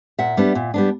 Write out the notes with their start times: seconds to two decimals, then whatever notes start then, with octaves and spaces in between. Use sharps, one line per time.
0.19 A#2 E5 F#5
0.37 G3 B3 D4
0.55 A#2
0.74 G3 B3 D4